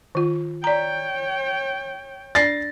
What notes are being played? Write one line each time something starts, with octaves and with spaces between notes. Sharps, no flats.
D#3 F4
C#5 D5 G5 A#5
D4 D5 A6 A#6 C7